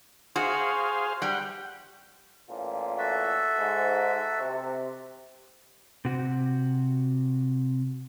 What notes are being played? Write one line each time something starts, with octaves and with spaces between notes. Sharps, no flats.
F#4 G#4 C5 F5
G3 F#5 G5
A1 A#2 F4
F#4 A4 E5
G#2
C3
C3 F#4